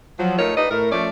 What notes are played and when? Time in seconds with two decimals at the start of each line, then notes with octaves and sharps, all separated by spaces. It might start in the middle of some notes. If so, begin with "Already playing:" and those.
0.18 F3 F#3
0.38 A3 D#4 F4 A#4 C#5
0.56 D#4 G4 B4 D5 D#5
0.70 A2 A3 A#4
0.91 F3 A3 C#4 D5